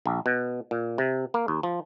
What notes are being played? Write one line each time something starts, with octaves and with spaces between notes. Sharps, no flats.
A#1
B2
A#2
C3
A#3
D#2
F3